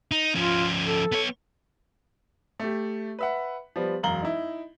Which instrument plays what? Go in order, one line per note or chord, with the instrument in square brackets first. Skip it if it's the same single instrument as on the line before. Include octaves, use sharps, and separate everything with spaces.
[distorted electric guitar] D#4
[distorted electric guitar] F3 C#4 [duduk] F4
[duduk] A4
[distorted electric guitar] B3 C#5
[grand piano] A3 G4
B4 E5 F#5
F3 G3 B3
E1 F#2 F5 A#5 F#7 G7
D#4 E4